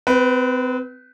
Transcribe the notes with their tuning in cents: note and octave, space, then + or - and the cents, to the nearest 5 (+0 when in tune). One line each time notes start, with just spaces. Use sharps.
C4 -35 B4 +0